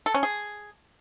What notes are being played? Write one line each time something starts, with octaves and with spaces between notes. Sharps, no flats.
A4
C#4
G#4